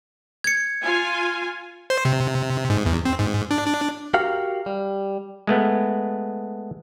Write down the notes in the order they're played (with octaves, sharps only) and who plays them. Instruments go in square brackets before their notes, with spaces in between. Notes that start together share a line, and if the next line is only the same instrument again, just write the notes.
[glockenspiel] G#6 C#7
[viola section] F4 G#5
[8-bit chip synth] C5
C3
G#2
E2
C4
G#2
D4
D4
[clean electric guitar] F#4 G4 A#4 F5
G3
[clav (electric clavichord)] G#3 A3 B3